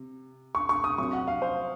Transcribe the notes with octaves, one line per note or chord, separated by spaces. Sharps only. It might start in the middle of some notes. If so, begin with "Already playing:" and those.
Already playing: C3
C#6
C#6
D#6
C2 C3 F#3 C#6
F#5
F5
C5